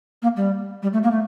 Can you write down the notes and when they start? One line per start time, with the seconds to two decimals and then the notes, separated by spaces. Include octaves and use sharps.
0.22 A#3
0.37 G3
0.83 G3
0.93 A3
1.03 A#3
1.11 A3